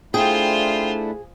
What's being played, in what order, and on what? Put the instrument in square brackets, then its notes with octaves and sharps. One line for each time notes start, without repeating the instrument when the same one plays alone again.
[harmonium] A3 D4 E4 [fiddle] F4 C5 [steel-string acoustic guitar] G#4 [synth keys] G5